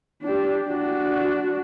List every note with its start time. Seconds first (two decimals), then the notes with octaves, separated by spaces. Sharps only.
0.22 D4 G4
0.68 D4 F#4